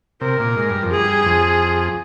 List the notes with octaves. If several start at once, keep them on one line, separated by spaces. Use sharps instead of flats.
C3 A#4
A#2
G#2
G2
F2
G#4
G2
F2